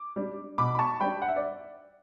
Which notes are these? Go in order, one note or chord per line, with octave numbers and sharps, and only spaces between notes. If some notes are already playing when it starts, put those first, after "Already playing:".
Already playing: D6
G3 D4
B2 B5 D6
B5
A5 C#6
G3 D4 G5 B5
F#5
E5
D5